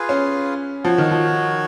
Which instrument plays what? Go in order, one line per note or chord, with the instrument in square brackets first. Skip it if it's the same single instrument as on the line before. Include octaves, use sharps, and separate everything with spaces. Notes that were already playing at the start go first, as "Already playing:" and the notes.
Already playing: [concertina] F4 G#4 B4 F5 G#5
[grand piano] C#4
[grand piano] F3 [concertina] F#4 C#5 F#5
[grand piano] D#3
F3